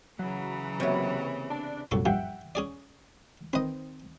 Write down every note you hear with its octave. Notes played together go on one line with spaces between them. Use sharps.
C#3 E3 F#3
C3 A#3 B3 C#5 D#5
D4 A5
C2 F#2 A#2 F#3 A4 C#6
G2 F3 E5 F#5 G5
C#4 G#4 D5
D#3 C4 B4 D#5